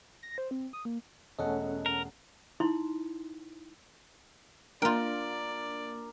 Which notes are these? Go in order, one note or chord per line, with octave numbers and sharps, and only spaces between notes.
A#6
C5
C4
D#6
A#3
E1 A3 C#4 A4 D#5 F#5
A#4
D#4 E4 C6
A#3 D4 F4 A#4 D5 G5